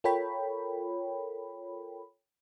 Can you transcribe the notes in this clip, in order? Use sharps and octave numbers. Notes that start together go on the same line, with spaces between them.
F4 A4 A#4 C#5 G5 B5